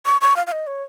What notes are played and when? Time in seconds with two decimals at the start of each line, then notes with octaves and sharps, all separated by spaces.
0.06 C#6
0.21 C#6
0.36 F5
0.47 F5
0.52 D#5
0.67 C#5